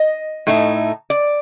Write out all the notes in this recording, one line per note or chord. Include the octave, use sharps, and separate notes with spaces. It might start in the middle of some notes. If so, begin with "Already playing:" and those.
Already playing: D#5
A2 A3 D#4
D5